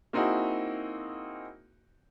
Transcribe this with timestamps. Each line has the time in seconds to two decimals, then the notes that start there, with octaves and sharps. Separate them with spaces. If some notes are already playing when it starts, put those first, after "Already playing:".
0.13 A#3 C4 D#4 E4 F#4 G#4